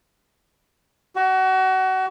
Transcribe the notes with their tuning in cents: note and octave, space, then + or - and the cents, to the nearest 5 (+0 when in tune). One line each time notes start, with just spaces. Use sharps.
F#4 +30